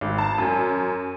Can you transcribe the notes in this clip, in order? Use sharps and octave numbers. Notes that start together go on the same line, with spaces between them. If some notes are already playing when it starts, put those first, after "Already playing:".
G#1
A5
F#2